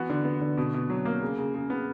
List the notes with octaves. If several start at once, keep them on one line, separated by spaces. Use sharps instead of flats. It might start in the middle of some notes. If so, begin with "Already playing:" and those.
Already playing: E3 B3 F#4
D3
B3
D3
B2
B2
F#3
A#3
C#3
C#3
C#3
B3